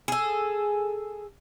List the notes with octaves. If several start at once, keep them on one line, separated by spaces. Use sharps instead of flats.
G#4 A4